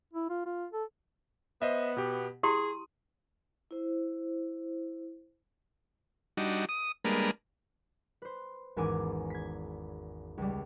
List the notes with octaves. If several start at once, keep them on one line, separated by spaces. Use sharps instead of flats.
E4
F4
F4
A4
B3 C5 D#5 E5
B2 G4
E4 G4 G#4 C6 D#6
E4 C5
G3 D4 D#4 F#4
D#6
G3 G#3 A#3 D4 A#4 B4
B4 C5
G#1 E2 E3 C#4 G#5 D6
G#6 B6
C#2 G3